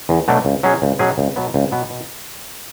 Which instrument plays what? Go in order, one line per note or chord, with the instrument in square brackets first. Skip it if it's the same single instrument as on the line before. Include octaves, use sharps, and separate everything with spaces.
[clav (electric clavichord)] E2
B2 F#3 A3 D4
C#2
B2 F#3 C#4 G#4
C#2
B2 F#3 C#4 G#4
C#2
B2 F#3 B3
C#2
B2 F#3 B3
B2